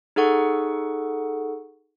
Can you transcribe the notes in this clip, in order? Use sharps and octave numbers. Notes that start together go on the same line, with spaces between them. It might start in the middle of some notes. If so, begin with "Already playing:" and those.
D#4 G#4 A4 F#5 C#6